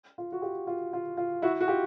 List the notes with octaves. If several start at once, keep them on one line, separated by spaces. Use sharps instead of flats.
F4
F#4
F4 G4
F4
F4
F4
E4 F#4
F#4
F4 G4